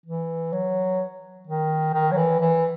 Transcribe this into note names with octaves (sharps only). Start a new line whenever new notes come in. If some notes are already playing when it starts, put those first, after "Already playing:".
E3
F#3
D#3
D#3
F#3
E3
E3